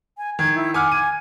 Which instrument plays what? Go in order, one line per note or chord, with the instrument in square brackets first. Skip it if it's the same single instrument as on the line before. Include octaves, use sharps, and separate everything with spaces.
[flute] G#5
[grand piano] D#3 [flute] G#6
[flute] E4
[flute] F#5 [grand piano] G#5 D6 F6
[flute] G#5 [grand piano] D#7